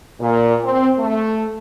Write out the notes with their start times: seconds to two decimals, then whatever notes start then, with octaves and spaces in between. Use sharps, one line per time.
0.21 A#2
0.64 C4
0.99 A3